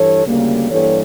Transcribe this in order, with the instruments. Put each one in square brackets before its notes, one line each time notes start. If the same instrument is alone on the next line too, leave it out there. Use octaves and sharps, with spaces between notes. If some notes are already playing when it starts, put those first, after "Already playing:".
Already playing: [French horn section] G2 E3 A4 C#5
D2 C#3 G3 A#3
G2 E3 G3 A#3 A4 C#5